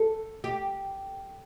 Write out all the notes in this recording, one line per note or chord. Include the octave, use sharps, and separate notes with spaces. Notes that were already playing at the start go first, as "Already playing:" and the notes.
Already playing: A4
G4